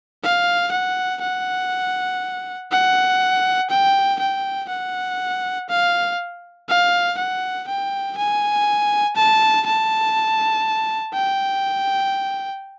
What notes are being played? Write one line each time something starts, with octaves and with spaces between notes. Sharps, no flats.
F5
F#5
F#5
F#5
G5
G5
F#5
F5
F5
F#5
G5
G#5
A5
A5
G5